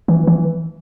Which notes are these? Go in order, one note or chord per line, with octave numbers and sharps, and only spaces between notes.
E3
E3